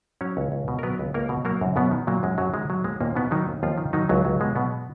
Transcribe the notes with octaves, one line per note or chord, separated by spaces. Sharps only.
F#3 C#4 C#5
C#2
C#2
B2
A#4
F#3 B3 B4
C#2
C#2 A#3 A#4
B2
F#3 A#3 A#4
F#2
F#2 B2 B3
D#3
A#2 F#3 A#3
F#2 G#3
F#2 F#3
D#3 G#3
F#3
D#2 G#3
D#2 A#2 A#3
B2 D#3 B3
D#3 F#3 D#4
D#2
D#2 F3 F4
D#3
D#3 F#3 D#4
C#2 F#3
C#2 F#3
B2 G#3
B2 F#3 B3